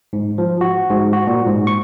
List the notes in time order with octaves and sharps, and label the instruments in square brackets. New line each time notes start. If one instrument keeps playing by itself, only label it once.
[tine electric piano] G#2
F3
F#4
G#2
F#4
A#2
G#2
C#6